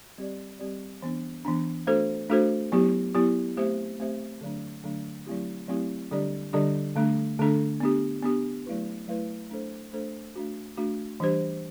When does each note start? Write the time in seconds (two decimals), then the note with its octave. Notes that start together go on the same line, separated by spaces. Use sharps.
0.18 G3 C4 G4 D5
0.59 G3 C4 G4 D5
1.02 E3 B3 D4
1.45 E3 B3 D4
1.87 A3 D4 F#4 A4 C5
2.30 A3 D4 F#4 A4 C5
2.72 F#3 B3 E4 G4
3.15 F#3 B3 E4 G4
3.57 A3 C4 G4 C5 E5
4.00 A3 C4 G4 C5 E5
4.41 D3 F#3 A3 D4
4.84 D3 F#3 A3 D4
5.27 F#3 A3 C4 E4 G4
5.68 F#3 A3 C4 E4 G4
6.11 D3 G3 D4 G4 D5
6.53 D3 G3 D4 G4 D5
6.95 D3 A3 D4 A4
7.39 D3 A3 D4 A4
7.80 B3 D4 G4
8.23 B3 D4 G4
8.66 F#3 A3 E4 B4
9.08 F#3 A3 E4 B4
9.50 A3 D4 A4 C5
9.93 A3 D4 A4 C5
10.36 A3 D4 F#4
10.77 A3 D4 F#4
11.20 E3 G3 D4 G4 C5